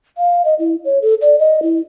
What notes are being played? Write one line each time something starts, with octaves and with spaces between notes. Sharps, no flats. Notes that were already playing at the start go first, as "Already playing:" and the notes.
F5
D#5
E4
C#5
A4
D5
D#5
E4